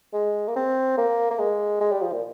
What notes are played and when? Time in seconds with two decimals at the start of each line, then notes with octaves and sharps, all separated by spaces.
0.13 G#3
0.48 A#3
0.56 C4
0.98 A#3
1.31 A#3
1.39 G#3
1.81 G#3
1.92 G3
2.02 F3
2.12 A#2